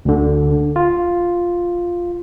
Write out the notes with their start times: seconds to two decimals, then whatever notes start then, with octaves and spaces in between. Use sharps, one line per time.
0.05 D2 D3
0.76 F4